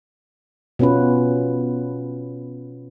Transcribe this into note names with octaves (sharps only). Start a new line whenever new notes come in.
B2 B3 C#4 F4 B4